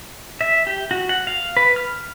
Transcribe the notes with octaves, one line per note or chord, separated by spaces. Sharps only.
E5
G4
F#4
F#5
F5
B4
F6